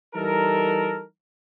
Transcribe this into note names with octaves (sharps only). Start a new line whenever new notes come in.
E3 G3 D#4 A4 A#4